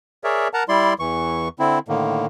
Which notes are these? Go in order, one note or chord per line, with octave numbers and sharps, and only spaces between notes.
G#4 A#4 C#5 D5 E5
A#4 F#5 A5 A#5
G3 E4 D5 C6
E2 E3 C#6
D3 C4 E4
A2 D3 D#3 A#3